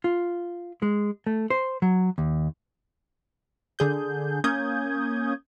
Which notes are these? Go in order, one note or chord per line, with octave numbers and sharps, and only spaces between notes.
F4
G#3
A3
C5
F#3
D#2
D3 G#4 G6
A#3 C#4 D#6 G6 G#6